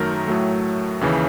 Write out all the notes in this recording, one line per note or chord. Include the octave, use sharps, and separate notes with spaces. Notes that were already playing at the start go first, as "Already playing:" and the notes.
Already playing: F#2 D#3 F#3 A3 A#4
A2 F#3 A3
D#2 C#3 E3